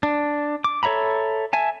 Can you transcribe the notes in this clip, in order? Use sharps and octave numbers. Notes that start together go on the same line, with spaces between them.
D4
D6
A4 C#5 E5 A#5 B5
E5 G#5 A5